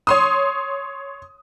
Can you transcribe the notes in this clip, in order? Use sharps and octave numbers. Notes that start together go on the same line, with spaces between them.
C#5 C6 D#6